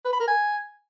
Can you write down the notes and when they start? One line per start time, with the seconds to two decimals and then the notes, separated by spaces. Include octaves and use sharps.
0.05 B4
0.13 B5
0.20 A#4
0.28 G#5